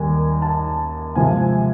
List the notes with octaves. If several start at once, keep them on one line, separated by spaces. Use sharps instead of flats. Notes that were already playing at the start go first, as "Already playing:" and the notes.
Already playing: D#2 D#3 G3 G#5
A5
C3 F3 G#3 G#5